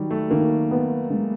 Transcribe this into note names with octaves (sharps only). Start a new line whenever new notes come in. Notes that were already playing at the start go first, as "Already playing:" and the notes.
Already playing: D#3 F#3 G3
A3
D#3 A#3
B3
G#3